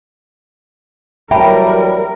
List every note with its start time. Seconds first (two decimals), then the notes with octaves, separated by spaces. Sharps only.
1.31 A1 F#3 G3 A#4 E5 G5 A5 B5